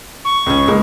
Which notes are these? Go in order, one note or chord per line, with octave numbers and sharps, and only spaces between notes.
C#6
C#2 C#4
C#2 G#3 A#3